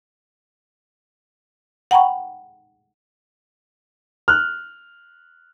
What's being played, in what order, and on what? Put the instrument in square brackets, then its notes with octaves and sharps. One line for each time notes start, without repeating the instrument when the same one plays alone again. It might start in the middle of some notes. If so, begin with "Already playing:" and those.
[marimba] F#5 G5 A#5 B5 C#6
[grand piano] F6 F#6